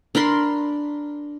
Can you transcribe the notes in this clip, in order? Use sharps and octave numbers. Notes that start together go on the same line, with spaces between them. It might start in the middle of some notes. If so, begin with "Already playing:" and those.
D4 A#4 B5 C6